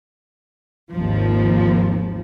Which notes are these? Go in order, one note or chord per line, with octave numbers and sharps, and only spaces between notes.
G#1 D#2 F3